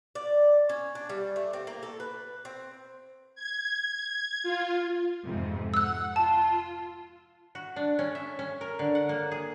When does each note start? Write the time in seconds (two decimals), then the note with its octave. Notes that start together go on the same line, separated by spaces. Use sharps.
0.15 D5
0.69 C#4
0.95 D4
1.09 G3
1.36 A3
1.53 C4
1.67 A#3
1.83 A4
2.00 B4
2.45 C4
3.35 G#6
4.43 F4
5.25 F2 G#2 C3
5.74 F#5 E6 F#6
6.16 F4 A5
7.55 F#4
7.76 D4
7.99 C#4
8.15 E5
8.39 C#4
8.61 A#4
8.79 D3
8.95 F#5
9.09 A#3
9.31 G#4